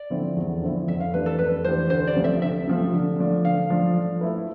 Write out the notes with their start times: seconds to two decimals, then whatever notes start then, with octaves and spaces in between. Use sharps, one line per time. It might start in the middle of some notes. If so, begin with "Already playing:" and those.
Already playing: D5
0.10 D3 F3 C4 E4
0.36 E2
0.62 D3 F3 C4 E4
0.87 F2 E5
1.00 F5
1.13 E3 A3 D4 G4 B4
1.26 A4
1.39 F2 B4
1.64 E3 A3 D4 G4 C5
1.90 D2 C5
2.07 D5
2.16 C3 F3 A3 C4
2.24 E5
2.42 D2 E5
2.67 C3 F3 A3 C4
2.93 D3
3.19 F3 A3 D4
3.45 D3 F5
3.70 F3 A3 D4
3.96 F3
4.21 A3 E4 B4